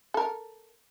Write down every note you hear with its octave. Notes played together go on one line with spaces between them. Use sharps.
A4 A#4